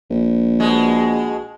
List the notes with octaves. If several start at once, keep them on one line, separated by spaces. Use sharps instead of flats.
A#1
B2 G#3